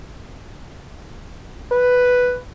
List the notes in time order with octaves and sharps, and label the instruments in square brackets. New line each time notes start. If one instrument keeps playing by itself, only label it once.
[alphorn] B4